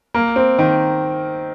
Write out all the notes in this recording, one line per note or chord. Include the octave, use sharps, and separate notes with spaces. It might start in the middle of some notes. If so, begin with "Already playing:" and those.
A#3
C4
D#3